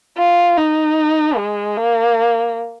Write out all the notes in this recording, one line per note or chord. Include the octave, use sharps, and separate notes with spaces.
F4
D#4
G#3
A#3